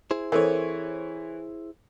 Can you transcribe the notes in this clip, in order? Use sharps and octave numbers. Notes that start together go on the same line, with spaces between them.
E4 G#4 C5
E3 C4 A4 A#4 C#5